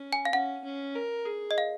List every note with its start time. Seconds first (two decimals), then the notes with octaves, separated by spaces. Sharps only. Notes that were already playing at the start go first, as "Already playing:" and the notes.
Already playing: C#4
0.13 G#5
0.25 F5
0.33 C#4 F#5
0.64 C#4
0.95 A#4
1.25 G#4
1.51 D#5
1.58 F5